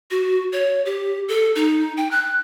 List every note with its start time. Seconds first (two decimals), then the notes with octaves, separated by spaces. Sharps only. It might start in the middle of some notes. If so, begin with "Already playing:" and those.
0.11 F#4
0.52 C#5
0.85 G4
1.29 A4
1.56 D#4
1.97 G5
2.11 F#6